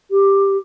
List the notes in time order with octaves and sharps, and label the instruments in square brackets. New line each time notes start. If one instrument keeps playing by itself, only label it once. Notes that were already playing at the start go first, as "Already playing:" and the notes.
[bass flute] G4